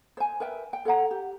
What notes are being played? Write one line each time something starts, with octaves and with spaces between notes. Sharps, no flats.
C5 G#5
A#4 B4 E5 G5
G5
A4 C#5 F#5 A#5
G4